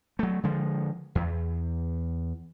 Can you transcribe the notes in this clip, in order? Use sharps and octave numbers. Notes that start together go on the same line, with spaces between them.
F#3 A3
D3 F3 G#3
E2